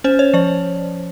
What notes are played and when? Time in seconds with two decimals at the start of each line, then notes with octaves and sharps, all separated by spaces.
0.04 C#4 C5
0.19 C#5
0.34 F3 D5